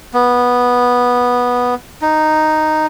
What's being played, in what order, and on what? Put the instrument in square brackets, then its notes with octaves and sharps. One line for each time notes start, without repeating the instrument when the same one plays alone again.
[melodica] B3
D#4